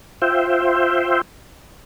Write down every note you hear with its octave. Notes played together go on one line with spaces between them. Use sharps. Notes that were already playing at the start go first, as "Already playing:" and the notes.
F4 C5 E5 G5